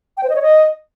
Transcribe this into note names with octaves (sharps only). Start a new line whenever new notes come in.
G5
C5
D#5
C#5
D#5